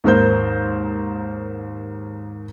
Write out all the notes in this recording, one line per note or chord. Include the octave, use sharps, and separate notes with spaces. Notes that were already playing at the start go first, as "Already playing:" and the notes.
D#2 G#2 A#4 C5 G6